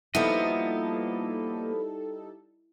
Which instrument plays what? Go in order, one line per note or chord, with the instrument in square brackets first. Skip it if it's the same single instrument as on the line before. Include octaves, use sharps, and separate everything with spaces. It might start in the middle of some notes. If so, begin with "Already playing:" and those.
[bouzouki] F3 B3 [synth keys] G3 D#4 A4 [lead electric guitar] A#3 D#5 [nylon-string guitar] E4